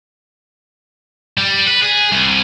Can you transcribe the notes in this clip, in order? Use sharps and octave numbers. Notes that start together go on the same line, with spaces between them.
G3
B4
G#4
C2